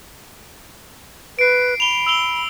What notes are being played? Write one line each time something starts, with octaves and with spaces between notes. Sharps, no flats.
B4 C7 D7
B5 F7 G7
E6 F7 G7